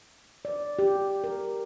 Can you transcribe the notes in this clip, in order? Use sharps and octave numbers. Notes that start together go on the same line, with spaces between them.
D5
G4
A#4